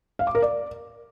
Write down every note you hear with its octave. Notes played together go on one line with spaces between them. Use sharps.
F5
D6
A#4
D5